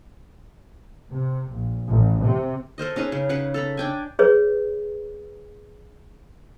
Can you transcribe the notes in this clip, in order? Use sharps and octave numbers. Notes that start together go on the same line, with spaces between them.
C3
A#1
A1
C3
A4 A#4 C5 D#5
C#4 D#4 G#4 B4
C#3
C#3 B4 F#5
A4 A#5 B5
D4 G5 G#5
G#4 B4 C#5